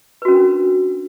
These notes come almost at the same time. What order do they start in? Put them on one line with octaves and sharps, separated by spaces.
B4 F#4 C#4 A#4 D4